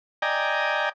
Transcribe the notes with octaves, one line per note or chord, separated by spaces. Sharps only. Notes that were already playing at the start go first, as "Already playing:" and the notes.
D5 D#5 G5 G#5 A#5